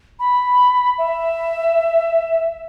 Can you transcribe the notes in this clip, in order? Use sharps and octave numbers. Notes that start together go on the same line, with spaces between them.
B5
E5